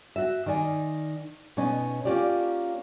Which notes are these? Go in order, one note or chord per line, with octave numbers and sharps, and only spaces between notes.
F#4 E5
D#3 D#4 D5 G#5
B2 C#4 D#4 D#5
A#3 C#4 F4 G4 D5